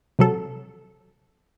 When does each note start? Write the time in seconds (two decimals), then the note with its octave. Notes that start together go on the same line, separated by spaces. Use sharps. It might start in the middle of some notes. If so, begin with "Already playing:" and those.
0.19 C3 F#3 A4